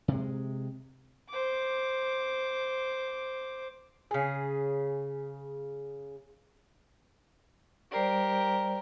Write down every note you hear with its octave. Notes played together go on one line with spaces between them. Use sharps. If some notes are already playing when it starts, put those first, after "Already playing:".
C3 G#3
C5 D6
C#3 G#4
G3 G4 A#4 C5 D5